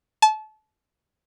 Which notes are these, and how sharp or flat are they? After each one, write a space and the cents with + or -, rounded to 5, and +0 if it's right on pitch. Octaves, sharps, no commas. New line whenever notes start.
A5 -30